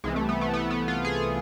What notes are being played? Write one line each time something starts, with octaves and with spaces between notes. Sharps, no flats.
C2 C3 E3 G#3
A3
B3
A3
B3
B3
F4
G#4